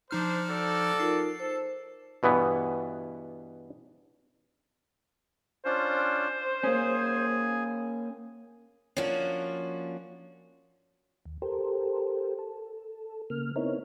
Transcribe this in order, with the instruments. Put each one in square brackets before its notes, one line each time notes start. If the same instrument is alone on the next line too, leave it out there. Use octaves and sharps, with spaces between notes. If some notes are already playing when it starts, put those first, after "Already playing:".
[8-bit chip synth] F3 D#4 F6 [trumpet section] D4 C5
[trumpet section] F#4 A4 D5
[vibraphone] D#4 F4 A#4 [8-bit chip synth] C7
[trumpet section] A4 [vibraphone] C5
[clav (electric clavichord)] G2 B2 E3 B3
[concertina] C#4 D4 F4 [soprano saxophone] C5
[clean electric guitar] A#3 C#4 [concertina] G#4 G#5
[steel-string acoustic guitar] F3 A#3 C#4 D4 F#4
[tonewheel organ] D#2
G4 A4 A#4 C5
A4
C#3 A#3 F6
B3 C4 D#4 E4 A#4 C#5